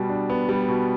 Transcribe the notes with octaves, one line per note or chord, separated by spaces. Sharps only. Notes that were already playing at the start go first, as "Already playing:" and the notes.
Already playing: B2 G3 B3
D4
B3
G3
B2